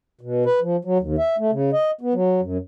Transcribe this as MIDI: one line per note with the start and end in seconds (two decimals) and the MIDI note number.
0.21 0.45 47
0.46 0.60 71
0.62 0.76 53
0.85 0.98 54
1.00 1.16 39
1.18 1.36 76
1.38 1.51 57
1.52 1.70 49
1.73 1.91 75
2.01 2.14 59
2.14 2.41 54
2.41 2.58 42